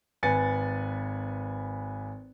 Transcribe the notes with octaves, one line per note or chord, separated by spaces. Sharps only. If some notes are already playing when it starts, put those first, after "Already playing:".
G#1 B4 G#5 A6 C#7